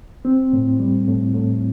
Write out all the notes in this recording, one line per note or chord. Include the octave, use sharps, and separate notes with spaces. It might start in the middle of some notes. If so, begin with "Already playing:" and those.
C4
A2
G3
A2
A2